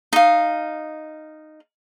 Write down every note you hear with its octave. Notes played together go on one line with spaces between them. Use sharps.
D#4 F5